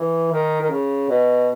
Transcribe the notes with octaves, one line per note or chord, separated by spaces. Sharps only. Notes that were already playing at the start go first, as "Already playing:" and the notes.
Already playing: E3
D#3
D#3
C#3
B2